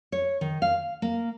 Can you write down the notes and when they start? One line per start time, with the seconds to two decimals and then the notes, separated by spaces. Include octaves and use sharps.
0.12 C#5
0.41 D#3
0.62 F5
1.02 A#3